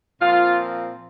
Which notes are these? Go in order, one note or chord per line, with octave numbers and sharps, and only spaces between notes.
A#2 F3 C4 F4